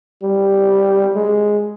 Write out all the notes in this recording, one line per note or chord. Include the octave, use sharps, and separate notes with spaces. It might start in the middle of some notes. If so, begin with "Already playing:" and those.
G3
G#3